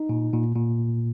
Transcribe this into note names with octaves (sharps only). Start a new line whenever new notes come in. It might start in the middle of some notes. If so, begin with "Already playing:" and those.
Already playing: D#4
A#2
A#2
A#2